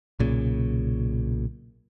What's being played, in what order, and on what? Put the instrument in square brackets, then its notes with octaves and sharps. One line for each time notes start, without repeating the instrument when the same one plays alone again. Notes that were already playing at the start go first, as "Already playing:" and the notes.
[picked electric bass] B1 A#2 C#3